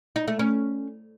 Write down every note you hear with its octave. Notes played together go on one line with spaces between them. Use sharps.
D#4
A3
C#4